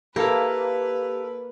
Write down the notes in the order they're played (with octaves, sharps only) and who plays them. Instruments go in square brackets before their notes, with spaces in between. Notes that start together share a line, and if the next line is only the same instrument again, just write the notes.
[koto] A#3 [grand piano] E4 A4 [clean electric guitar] G4 F5 [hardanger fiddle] B4